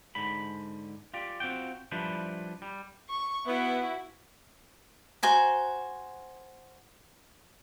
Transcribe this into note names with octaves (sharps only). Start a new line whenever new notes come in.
G#2 D3 B5
F4 G4 D5
C4 F4 F#4 G5
F3 G3 D4 E4 B4 C5
G3
C#6
B3 E4 F#4
F#4 C5 G#5 A#5